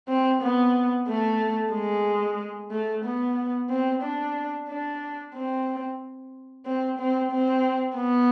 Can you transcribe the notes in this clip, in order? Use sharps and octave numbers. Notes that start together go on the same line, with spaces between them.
C4
B3
A3
G#3
A3
B3
C4
D4
D4
C4
C4
C4
C4
B3